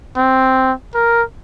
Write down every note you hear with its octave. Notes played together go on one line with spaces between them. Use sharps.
C4
A#4